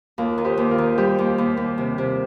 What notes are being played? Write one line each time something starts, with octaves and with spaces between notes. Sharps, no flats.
D#2 F4 A#4
D#3
G4 C5
D#2
F4 A#4
D#3
G3 G4 C5
D#2
D#2
D#2
C3
C3